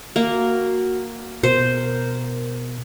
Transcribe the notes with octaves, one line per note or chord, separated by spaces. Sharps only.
A#3 F#4
B2 A#4 C5